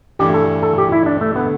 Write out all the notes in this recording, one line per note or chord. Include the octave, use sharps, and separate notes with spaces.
G2 E3 A3 D4 G4
A4
A4
G4
E4
D4
A3
D3 A3 B3